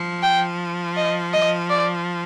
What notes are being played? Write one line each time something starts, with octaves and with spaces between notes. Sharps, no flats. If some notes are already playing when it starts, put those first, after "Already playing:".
Already playing: F3
G5
D#5
D#5
D5